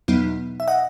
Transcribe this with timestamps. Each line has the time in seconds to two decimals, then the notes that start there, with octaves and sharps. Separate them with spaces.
0.08 E2 B2 F#3 B3 D#4
0.60 E5
0.68 D#5 F#5